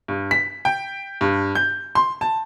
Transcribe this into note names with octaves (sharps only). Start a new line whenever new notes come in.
G2
B6
G5
G2
G6
C6
A5